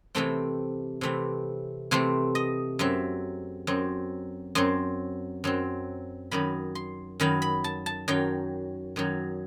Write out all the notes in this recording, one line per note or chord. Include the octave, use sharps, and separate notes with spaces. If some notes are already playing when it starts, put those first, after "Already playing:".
C3 E3 A3 C4 G5
C3 E3 A3 C4
C3 E3 A3 C4 C5
D#5
F#2 F#3 C4 E5
F#2 F#3 C4
F#2 F#3 C4 C6
F#2 F#3 C4
F#2 D#3 F#3 B5
C6
F#2 D#3 F#3 B5
B5
A5
A5
F#2 D#3 F#3 G5
F#2 D#3 F#3